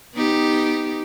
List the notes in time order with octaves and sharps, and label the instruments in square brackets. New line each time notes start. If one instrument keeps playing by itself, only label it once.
[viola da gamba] B3 D#4 G4